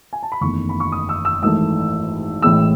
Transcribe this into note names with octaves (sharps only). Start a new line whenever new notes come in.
G#5
A5
B5
F#1 E2 D#3 A3 C#6
B5
C#6
D#6
E6
E6
G#1 G#2 E3 A3 E6
A1 A2 E3 G#3 E6